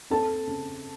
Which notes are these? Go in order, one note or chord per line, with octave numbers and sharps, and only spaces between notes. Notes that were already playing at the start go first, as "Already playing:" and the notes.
C4 A4 A5
C#3